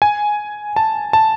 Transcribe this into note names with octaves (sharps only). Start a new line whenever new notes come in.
G#5
A5
A5